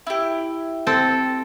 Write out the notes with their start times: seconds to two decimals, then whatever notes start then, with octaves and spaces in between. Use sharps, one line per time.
0.07 E4 G4
0.87 C4 A4